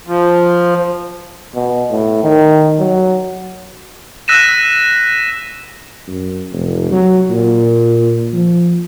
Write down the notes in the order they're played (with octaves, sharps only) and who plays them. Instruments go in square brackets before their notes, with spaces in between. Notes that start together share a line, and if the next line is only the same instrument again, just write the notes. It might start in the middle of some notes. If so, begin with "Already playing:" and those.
[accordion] F3
[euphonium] B2
A2
D#3
F#3
[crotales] E6 F#6 A#6 B6 D#7 E7
[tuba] F#2
F1
F#3
A#2
F3